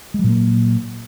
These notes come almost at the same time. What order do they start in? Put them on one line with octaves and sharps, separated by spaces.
G#3 F#3 A#2 A#3